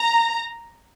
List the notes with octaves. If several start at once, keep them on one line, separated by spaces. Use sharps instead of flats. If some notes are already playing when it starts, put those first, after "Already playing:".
Already playing: A#5